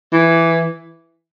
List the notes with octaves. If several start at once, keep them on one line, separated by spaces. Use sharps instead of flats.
E3